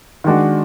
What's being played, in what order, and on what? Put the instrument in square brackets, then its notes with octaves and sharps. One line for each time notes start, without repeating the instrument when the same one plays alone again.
[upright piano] D#3 G#3 D4 F#4